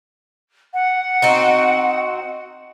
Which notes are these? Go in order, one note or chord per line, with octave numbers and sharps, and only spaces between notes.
F#5
C4 D#4 F#4